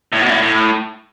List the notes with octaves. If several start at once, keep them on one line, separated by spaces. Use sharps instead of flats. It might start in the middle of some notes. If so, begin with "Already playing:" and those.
A2
B2
A2
A2